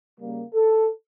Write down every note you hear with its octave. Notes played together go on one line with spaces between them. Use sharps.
C#3 G3 A#3
A4